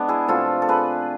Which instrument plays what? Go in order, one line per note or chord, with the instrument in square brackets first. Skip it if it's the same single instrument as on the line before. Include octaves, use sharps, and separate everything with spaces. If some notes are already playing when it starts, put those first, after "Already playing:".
Already playing: [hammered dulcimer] G#3 B3 D4
E4 G#4
C3 F3 A3 F4 A4
A4
G#4 B4